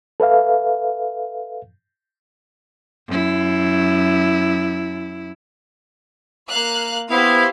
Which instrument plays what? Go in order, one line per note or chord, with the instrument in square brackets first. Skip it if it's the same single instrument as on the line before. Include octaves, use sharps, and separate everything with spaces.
[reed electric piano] A4 B4 E5 F5
[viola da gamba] F#2 E4
[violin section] A#3 F5 F#6
[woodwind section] B3 E4 [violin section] G4 C5 F5